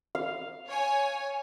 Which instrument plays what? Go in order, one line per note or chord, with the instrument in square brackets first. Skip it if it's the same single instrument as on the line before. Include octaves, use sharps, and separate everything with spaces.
[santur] F5
[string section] C#5 G#5